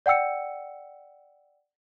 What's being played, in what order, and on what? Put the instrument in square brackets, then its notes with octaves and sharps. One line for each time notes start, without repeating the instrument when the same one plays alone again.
[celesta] D5 F#5 G5 E6 C#7